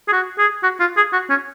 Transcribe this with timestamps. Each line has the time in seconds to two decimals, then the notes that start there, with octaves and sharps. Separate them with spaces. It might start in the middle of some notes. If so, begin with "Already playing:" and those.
0.08 G#4
0.13 F#4
0.39 G#4
0.63 F#4
0.80 F4
0.97 G#4
1.13 F#4
1.30 C#4